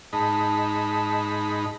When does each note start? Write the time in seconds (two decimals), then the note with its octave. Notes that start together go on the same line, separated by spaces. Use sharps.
0.13 G#2 D#4 A5 B5